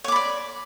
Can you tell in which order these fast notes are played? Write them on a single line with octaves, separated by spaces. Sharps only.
C#5 D6 B5 D5